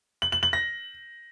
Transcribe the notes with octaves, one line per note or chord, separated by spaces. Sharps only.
F#7
F#7
F#7
A#6